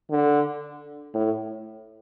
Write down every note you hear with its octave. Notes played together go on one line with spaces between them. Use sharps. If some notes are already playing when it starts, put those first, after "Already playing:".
D3
A2